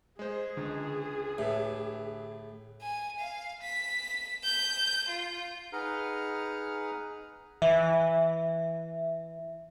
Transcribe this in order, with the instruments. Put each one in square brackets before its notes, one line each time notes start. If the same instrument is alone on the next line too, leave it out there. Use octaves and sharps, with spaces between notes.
[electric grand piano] G#3 C5 [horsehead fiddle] G#4
[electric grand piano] C#2 [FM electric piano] D3
[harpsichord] A2 [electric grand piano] G4 B4 E5
[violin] G#5
F5
B6
G6
F4
[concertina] D#4 G#4 B4 F#5 A#5 F6
[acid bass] E3 [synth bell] E5